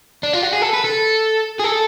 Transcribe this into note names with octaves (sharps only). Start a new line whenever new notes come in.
D4
F4
F#4
G#4
A4
B4
A4
G#4
A4